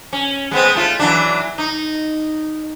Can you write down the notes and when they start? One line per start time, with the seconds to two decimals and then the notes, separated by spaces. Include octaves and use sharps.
0.13 C#4
0.51 G#3 B3 C4
0.75 A3 F4
0.99 E3 F#3 D4
1.58 D#4